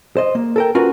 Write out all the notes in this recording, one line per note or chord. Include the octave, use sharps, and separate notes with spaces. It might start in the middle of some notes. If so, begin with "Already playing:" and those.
C5 D#5
A#3
A4 A#4 G5
C#4 F4 F#4 A#4 B4